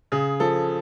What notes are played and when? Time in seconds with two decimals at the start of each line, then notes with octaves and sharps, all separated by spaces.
0.12 C#3 G#4
0.40 F3 A4